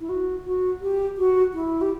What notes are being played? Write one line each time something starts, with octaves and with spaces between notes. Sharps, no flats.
E4
F#4
F#4
G4
F#4
E4
G4